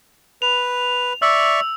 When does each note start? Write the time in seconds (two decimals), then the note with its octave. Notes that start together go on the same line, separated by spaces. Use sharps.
0.42 B4 F7
1.22 D5 E5 C#6 E6